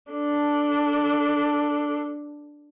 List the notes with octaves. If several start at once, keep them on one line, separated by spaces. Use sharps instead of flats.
D4 A4